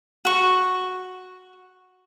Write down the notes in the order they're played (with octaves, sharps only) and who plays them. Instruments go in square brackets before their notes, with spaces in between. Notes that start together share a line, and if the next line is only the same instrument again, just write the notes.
[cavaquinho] F#4 C#6